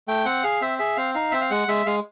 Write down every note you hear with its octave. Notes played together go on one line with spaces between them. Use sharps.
A3 G5
C4 F#5
G#4 F5
C4 E5
G#4 E5
C4 F5
D#4 F5
C4 E5
F5
G#3 F#5
G#3 E5
G#3 F5